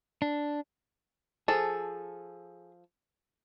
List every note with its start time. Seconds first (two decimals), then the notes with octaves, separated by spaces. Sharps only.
0.22 D4
1.48 F3 G#4 A4